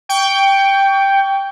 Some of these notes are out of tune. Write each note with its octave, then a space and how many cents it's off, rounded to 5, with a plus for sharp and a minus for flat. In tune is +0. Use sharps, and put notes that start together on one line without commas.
G5 +5 C#6 +35